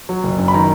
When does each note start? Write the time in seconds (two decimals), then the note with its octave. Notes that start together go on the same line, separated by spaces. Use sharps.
0.09 F#3
0.23 F#1
0.38 F#2
0.48 B5
0.54 D#3 A#5